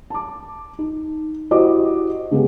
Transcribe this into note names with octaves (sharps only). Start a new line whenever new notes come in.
A5 D6
D#4
E4 F#4 G4 C5 D#5 D6
C#3 G#3 B3 G4